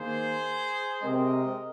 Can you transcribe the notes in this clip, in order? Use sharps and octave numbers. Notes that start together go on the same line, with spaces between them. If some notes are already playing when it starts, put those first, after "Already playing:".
Already playing: D#3 A#3 G#4 C5
C3 G#3 C4 A#4 D#5